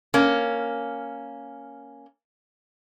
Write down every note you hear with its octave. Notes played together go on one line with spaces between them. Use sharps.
A#3 C#4